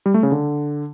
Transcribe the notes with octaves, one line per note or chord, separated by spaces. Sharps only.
G3
A3
C#3
D3